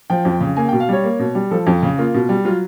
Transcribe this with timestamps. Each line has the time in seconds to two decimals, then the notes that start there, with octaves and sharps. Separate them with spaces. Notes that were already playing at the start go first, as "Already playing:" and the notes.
0.10 F3 G5
0.25 F2
0.41 C#3
0.57 A#3 G#5
0.69 G5
0.73 B2
0.80 F5
0.89 G3 C#5
1.04 A#3
1.19 B2
1.35 G3
1.51 F3 A4
1.67 F2
1.83 C#3
1.98 A#3 F4
2.14 B2
2.29 G3
2.45 F#3 F4